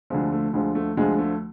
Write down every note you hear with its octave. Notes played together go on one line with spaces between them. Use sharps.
D2 D3 F3 G#3
A3
D2 D3 F3 G#3
A3
D2 D3 F3 G#3
A3